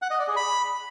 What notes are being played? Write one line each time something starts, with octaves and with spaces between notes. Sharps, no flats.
F#5
D#5
D5
G#4
B5